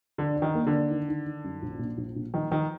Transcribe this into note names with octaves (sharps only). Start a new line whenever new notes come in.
D3 D4
D4
D#3
A#3
D3
A#3
D#3
D#3
D#3
F#2
A#1
A#2
A#1
A#2
D#3 F3
D#3 F3